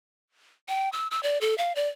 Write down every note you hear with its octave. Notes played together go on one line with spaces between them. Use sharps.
G5
E6
E6
D5
A4
F5
D5